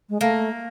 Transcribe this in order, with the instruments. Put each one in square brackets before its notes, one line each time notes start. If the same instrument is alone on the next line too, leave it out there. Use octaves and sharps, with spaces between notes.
[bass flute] G#3
[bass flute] A3 [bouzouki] A#3